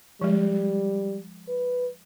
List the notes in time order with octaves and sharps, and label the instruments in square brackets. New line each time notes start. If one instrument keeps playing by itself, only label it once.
[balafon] F3 G#3 [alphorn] G3
[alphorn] B4